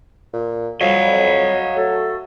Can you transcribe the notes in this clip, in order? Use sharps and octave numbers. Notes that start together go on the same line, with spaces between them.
A#2
F2 F#3 G3 C#5 D#5 F5
A3 F#4 A4